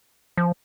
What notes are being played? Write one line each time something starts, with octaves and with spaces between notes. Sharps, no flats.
F3